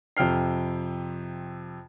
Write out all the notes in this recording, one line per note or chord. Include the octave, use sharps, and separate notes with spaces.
F2 C3 G5 F6 C7